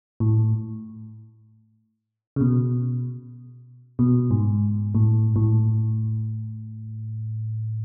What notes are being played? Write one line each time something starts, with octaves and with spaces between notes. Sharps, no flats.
A2
C#3
B2
B2
G#2
A2
A2